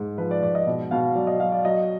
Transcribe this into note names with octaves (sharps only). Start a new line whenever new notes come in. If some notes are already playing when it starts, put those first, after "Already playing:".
Already playing: G#2 G#3
F3 B4
D5
G#2 D5
D#5
B2
B2 F5
F#3 D5
D#5
F#3 F5
D5
F#3 D#5